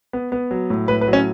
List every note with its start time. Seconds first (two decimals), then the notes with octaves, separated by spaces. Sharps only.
0.13 B3
0.32 B3
0.51 F#3
0.70 A2
0.88 A2 B4
1.01 B4
1.08 F#3
1.13 C#4